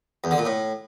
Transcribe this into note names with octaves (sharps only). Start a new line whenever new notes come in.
E2
D3
A#2
A2